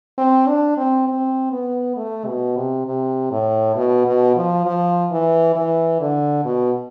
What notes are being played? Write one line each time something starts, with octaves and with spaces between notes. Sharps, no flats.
C4
D4
C4
C4
B3
A3
B2
C3
C3
A2
B2
B2
F3
F3
E3
E3
D3
B2